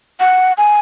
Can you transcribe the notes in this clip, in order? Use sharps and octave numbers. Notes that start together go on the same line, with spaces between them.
F#5
G#5